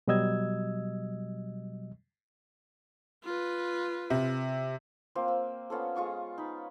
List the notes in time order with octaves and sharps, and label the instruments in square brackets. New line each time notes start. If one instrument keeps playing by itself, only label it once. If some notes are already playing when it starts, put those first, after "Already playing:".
[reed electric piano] B2 F#3 G3 D#5 E6 G#6
[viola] F4 B4
[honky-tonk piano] C3
[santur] A#3 C4 F4
E6
B3 C#4 F4 A4
G#3 F4 C#6 D#6
D#4 B5